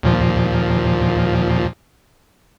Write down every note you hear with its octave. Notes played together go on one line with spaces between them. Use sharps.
D#2 A#2 F3